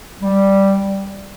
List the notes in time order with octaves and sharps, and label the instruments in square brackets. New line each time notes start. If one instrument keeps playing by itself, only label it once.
[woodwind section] G3